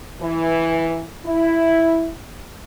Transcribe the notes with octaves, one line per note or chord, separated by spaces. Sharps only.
E3
E4